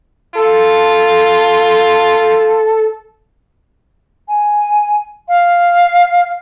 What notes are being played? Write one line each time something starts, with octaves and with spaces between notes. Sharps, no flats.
F4 A4
G#5
F5